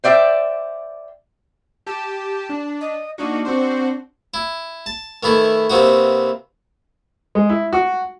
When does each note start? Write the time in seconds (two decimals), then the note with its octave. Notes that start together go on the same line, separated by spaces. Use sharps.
0.04 C5 D5 E5 G5
1.87 G4 A5
2.49 D4
2.81 D#5
3.18 A#3 D4 D#4 F#4
3.45 C4 F#4 C5
4.34 E4
4.86 A5
5.23 D#3 E3 A3 E4
5.70 C3 E3 A#3 C4 D#4 F#4
7.35 G#3
7.49 E4
7.73 F#4